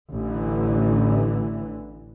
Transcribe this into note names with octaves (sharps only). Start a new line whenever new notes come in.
A1 D3 E3